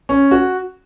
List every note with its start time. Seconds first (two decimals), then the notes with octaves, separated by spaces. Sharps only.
0.09 C#4
0.31 F#4